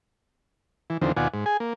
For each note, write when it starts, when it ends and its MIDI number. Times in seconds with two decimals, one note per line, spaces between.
0.90 0.97 52
1.01 1.12 40
1.01 1.12 50
1.01 1.12 51
1.01 1.12 53
1.01 1.12 60
1.17 1.28 39
1.17 1.28 47
1.17 1.28 65
1.17 1.28 74
1.17 1.28 78
1.17 1.28 80
1.34 1.45 44
1.46 1.57 68
1.46 1.57 80
1.60 1.73 58